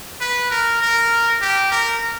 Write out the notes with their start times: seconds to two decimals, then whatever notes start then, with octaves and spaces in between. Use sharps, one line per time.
0.21 B4
0.51 A#4
0.82 A#4
1.41 G4
1.72 A#4